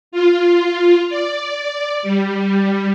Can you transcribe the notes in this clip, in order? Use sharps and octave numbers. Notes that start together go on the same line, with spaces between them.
F4
D5
G3